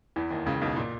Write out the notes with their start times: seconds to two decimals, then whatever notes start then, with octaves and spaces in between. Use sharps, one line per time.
0.16 E2 E3
0.30 D#2 D#3
0.46 C#2 C#3
0.61 B1 B2
0.77 A#2